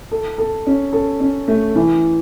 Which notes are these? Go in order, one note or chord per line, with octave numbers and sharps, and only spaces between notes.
A4
A4
C#4
A4
C#4
A3
E3